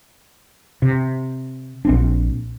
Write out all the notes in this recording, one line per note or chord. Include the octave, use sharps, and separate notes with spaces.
C3
A#1 C4 D4